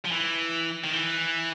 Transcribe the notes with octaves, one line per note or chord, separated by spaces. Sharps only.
F3
E3
D#3
E3